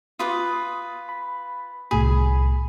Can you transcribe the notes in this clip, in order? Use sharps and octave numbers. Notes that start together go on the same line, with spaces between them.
F4 B4 D6 D#6
B5
C2 A2 G#4 B5